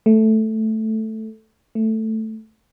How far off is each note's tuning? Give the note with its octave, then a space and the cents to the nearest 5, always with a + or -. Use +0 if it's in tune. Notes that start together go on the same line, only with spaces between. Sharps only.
A3 +0
A3 +5